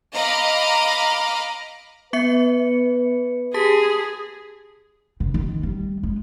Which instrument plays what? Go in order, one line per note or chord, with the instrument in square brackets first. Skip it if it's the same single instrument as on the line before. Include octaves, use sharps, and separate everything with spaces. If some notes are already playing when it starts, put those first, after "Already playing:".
[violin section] D#5 F5 A#5 B5 D6
[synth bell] B3 E5 C#7 [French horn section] B4
[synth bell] G4 A5 B6 [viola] G#4
[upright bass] C#3
D#3
G3
G#3